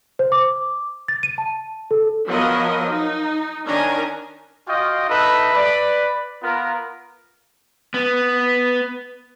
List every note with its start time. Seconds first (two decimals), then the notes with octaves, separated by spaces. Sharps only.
0.19 C5
0.32 D6
1.08 A6
1.23 D#7
1.38 A5
1.91 A4
2.27 F3 F#3 B3 A#4 C#5 D#5
2.92 D#4
3.65 D#3 C#4 D4 G#5 A#5
4.67 F4 F#4 D#5 F5 G5
5.08 D#4 A4 B4 D#5 E5
5.54 B4 D5
6.42 B3 F4 A#4
7.94 B3